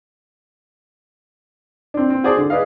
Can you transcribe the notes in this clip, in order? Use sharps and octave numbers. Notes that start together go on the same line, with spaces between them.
C4 D4
C4
F#4 G#4 C5 D5 A5
D3
G#4 B4 D5 D#5 F5